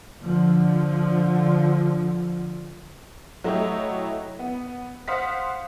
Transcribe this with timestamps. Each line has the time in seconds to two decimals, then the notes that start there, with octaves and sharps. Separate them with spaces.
0.23 D3 F3
3.44 F#3 A3 E4 G4 C#5 D#5
4.39 B3
5.08 C5 F5 F#5 D#6 B6